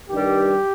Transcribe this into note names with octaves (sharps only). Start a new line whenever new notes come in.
G2 D#3 G3 G4